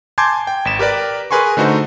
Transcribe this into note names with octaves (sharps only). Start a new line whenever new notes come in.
G#5 A5 C6 D6 G6 G#6
G5
G#1 B6 E7
G4 A#4 B4 D5
G#4 A#4 B4 G#5 C6 C#6
D3 A3 D#4 F#4 C5